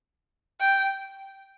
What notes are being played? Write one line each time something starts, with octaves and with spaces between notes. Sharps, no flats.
G5